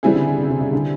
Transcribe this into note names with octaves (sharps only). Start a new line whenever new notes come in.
C#3 E3 G3 C4 E4 G#4
D3
C#3
C3
C3
C#3
D3